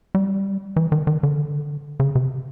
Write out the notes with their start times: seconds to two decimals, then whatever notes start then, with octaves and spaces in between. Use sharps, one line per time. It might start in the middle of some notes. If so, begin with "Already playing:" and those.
0.15 G3
0.76 E3
0.92 D#3
1.07 D#3
1.23 D3
2.00 C#3
2.15 C3